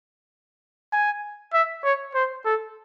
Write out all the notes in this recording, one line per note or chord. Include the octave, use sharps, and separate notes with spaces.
G#5
E5
C#5
C5
A4